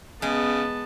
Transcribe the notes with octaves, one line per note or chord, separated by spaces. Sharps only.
C#3 G#3 B3 A5